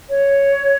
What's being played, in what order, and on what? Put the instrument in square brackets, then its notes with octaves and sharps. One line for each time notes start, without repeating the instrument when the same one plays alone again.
[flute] C#5